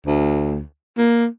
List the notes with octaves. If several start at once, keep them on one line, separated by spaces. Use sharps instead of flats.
D2
A#3